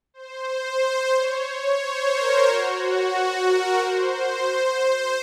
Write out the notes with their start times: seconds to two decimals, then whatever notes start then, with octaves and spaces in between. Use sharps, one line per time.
0.14 C5
1.14 C#5
1.46 C#5
1.81 C5
2.13 A#4
2.47 F#4
3.46 A#4
3.79 C5
4.45 C5